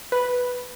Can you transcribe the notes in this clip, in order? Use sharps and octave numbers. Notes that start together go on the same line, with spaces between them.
B4